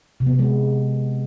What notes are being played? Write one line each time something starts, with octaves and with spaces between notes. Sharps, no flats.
C3
B3
C3
G#3